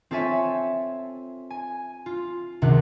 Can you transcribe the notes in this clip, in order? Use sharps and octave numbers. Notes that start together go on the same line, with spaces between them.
C4 F4 A4 C#5 E5 G#5
G#5
F4
F1 C#2 C3 D#3 F#5